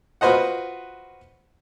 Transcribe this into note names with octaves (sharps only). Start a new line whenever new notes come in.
F4 F#4 B4 C5 D#5 F#5